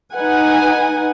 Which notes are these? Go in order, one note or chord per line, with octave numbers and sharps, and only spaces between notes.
D#4 B4 F#5 G#5